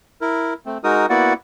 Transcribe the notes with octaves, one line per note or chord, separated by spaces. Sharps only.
E4 A#4
A3 C4
G#3 D#4 F#4 A#4 D#6
A#3 B3 E4 F#4 D5 F#5